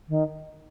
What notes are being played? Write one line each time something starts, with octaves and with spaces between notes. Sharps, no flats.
D#3